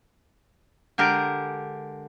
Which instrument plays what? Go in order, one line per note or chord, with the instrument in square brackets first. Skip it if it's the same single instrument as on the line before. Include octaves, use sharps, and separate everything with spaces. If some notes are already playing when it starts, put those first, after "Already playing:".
[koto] D3 G#3 G4 A#4 A#5